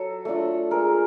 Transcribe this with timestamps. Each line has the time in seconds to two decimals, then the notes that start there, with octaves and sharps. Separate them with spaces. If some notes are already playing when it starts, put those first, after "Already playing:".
Already playing: F#3 A4
0.25 A3 D4 F4
0.71 G#3 A#4